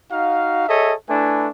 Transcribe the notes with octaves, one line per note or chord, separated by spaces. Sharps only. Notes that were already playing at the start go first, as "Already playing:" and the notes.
D#4 F#4 F5
G#4 A4 C#5 D#5 E5
A3 D4 E4 B4 G#5